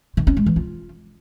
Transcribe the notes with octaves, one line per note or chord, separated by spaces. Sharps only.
D#3
C#4
G#3
E3
F4